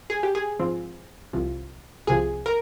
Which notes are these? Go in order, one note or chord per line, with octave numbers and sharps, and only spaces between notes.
G#4
G4
G#4
G#2 F3 C4
C2 C3 F3
C2 C3 F3 G#4
A#4